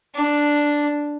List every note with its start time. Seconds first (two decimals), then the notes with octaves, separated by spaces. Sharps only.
0.15 D4